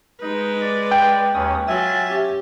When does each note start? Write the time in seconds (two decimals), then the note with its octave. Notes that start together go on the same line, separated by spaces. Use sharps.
0.21 G#3 D#4 B4
0.61 D5
0.91 G5
1.34 D#2 C#4 D#6
1.68 F#3 F4 E5 G#5 A6
2.08 C#4 G4